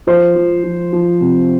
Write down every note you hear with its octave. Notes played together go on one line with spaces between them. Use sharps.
F3 C5
F3
F3
F3
C3